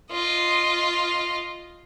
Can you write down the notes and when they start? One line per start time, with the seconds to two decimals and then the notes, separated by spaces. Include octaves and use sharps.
0.11 F4 D#5